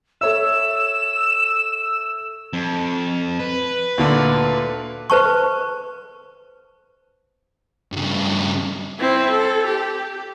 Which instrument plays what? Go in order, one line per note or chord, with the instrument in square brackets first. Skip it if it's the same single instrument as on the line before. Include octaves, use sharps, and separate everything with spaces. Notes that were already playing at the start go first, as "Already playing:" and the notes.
[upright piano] A4 C#5 E5 [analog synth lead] E6 [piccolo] E7
[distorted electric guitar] F2
B4
[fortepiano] D2 A#2 D3
[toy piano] B4 C5 A5 C#6
[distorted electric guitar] G2 C#3
[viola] C4 E4
A4
G4